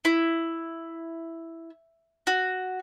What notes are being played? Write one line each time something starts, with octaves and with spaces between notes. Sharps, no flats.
E4
F#4